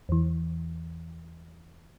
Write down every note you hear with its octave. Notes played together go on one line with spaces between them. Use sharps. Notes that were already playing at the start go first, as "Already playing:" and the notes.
E2 E3